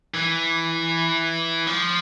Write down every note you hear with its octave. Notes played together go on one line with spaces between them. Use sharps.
E3
F3